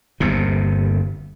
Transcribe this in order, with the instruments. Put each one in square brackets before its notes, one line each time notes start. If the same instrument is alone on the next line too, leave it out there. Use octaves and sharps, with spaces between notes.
[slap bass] G1 D#2 C3